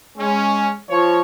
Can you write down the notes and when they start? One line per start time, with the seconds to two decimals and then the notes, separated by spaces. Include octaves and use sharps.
0.18 G#3 C#4
0.89 F3 C#5